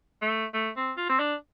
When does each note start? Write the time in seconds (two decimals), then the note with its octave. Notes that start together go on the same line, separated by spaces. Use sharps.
0.22 A3
0.54 A3
0.77 C4
0.97 F4
1.09 C4
1.19 D4